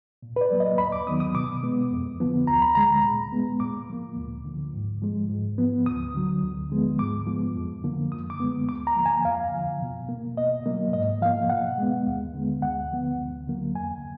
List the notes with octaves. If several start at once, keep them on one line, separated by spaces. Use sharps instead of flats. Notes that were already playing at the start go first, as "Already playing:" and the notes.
A#2
B4
D5
F#3 A#3
D#5
D#2 B5
D6
D#3 F#3 B3 D#6
D#6
B2 D6
G#3 B3
F2
D3 F3 B3
D2 A#5
B5
D3 G#3 A#5
A#2
G#3 B3
A#2 D6
F3 A#3
D2
D3 F3
G#2
F3 G#3
G#2
F3 B3
D2 D#6
D3 F#3
D2
D3 F3 G#3 B3
G#2 D6
F3 G#3 B3
F2
D3 F3 A#3
F#2 D#6
D6
D3 G#3 B3
D2 D6
A#5
D3 F3 A#3
G#5
F2 F5
D3 F3
B2
A#3
B2 D#5
F#3 A#3
G#2 D#5
F3 A#3 F5
B2 F#5
G#3 B3
D#2
D3 G#3 B3
D2 F#5
D3 F3 B3
D2
D3 F#3 A#3
F2 G#5